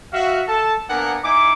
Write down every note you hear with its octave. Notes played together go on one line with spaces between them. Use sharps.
F#4 E5 F5
A4 A5
A#3 B3 D4 A#4 F#5 G#5
D#4 E4 G#5 D6